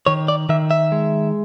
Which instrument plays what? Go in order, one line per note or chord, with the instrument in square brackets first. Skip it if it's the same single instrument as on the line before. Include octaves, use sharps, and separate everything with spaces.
[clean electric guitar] D#3 C#5
D5
D#3 E5
E5
G#3